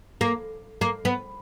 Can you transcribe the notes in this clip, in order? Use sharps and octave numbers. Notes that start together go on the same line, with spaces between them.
A#3
A#3
B3